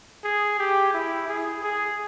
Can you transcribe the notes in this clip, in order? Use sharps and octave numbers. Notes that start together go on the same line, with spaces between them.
G#4
G4
E4
G#4
G#4